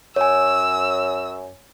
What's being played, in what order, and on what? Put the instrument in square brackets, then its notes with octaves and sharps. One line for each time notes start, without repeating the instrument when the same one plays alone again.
[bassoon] F#2 [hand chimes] C#5 G#5 [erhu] E6